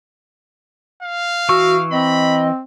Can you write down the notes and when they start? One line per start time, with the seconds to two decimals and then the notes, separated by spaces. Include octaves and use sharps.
1.03 F5
1.49 E3 F#4 C#6 E6
1.91 C4 D#5 B5